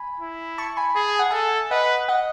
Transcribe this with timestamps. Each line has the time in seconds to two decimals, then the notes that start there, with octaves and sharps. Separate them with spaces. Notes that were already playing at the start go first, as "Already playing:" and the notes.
Already playing: G#5 B5
0.20 E4
0.58 A5 C#6
0.77 G#5 B5
0.96 G#4 A5
1.08 G#5
1.19 F#5
1.31 A4 E5 G#5
1.71 B4 D#5 F#5
2.08 D#5 F#5